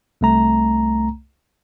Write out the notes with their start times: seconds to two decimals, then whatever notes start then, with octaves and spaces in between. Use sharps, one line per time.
0.21 C2 A3 A#5